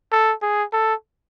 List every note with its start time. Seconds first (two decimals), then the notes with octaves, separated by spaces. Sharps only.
0.12 A4
0.42 G#4
0.73 A4